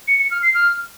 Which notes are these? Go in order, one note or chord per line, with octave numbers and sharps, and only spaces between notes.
C#7
C#7
F6
C7
F6